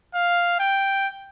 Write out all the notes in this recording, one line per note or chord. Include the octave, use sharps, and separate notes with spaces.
F5
G5